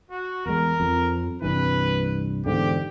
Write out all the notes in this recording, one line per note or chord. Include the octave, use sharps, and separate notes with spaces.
F#4
E2 G#3 A#4
F2
C2 G2 E3 B4
E2 G#2 D3 G4